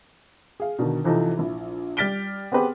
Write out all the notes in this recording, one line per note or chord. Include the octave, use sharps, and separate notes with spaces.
G#4 F5
B2 D3 D#3
C3 E3 F3 D#4 A4
A#1 E4
G3 F6 A6 B6 D7 G7
B3 C4 G4 G#4 B4 C5